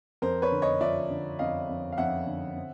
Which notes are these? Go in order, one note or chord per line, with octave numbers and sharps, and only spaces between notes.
F2 A#4 C5
B4 C#5
D3
C#5 D#5
F3 D5 E5
D3
F2 D#5 F5
F2
F5
F2 E5 F#5
D3
C4